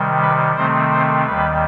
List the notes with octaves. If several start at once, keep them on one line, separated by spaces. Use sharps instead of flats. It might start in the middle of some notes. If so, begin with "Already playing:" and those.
Already playing: C3 D#3 G3
B4
C3 D#3 A3 C4 C5
C5
D#2 D#3 G3 B4